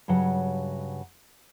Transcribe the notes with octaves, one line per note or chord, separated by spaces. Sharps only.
G2 C#3 F#3 F#5